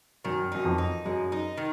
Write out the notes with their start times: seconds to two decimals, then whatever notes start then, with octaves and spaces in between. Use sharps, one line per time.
0.25 F#2 D#3
0.52 F#2 D#4
0.65 F2
0.78 D#4
1.05 F#2 G#3
1.32 D#4
1.57 D#3